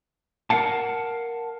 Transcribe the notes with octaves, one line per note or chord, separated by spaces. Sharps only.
A#4 B4 F5 F#5 A5